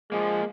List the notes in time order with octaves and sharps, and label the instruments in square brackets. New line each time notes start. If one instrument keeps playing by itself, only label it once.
[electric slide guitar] F3 A#3 [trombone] G#3